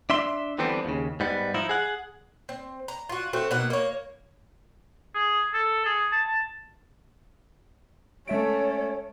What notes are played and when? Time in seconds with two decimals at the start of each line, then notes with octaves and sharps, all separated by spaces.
0.10 D4 E5 C6
0.58 D3 E3 G3 B3 C4 D4
0.85 D#2 C#3
1.20 G#2 G3 B3
1.54 F3 D#4 E4
1.69 G#4 F#5
2.49 C4
2.88 A#5
3.09 F4 F#4
3.33 A3 C4 F#4
3.51 B2 A#3 D#4 F#5
3.70 A#3 C#5
5.15 G#4
5.53 A4
5.86 G#4
6.12 A5
8.28 G#3 A3 C#4 C#5 E5 D7